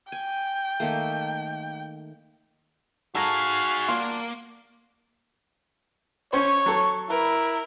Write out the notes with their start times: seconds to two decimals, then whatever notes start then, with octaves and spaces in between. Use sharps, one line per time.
0.12 G5 G#5
0.80 D#3 A3 A#3
3.15 D#4 F#4 G#4 A4 F5 A5 A#5 G#6
3.88 A#3 D4 F4
6.33 C#4 C5 C#5 C#6
6.66 F#3 A4
7.10 E4 A#4 B4